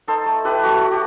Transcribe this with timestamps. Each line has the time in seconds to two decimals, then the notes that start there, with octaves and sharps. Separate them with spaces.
0.08 D#4 A4 C5
0.26 A3
0.44 E4 G4 B4
0.63 A3 F#4
0.81 A3 F#4
0.91 G4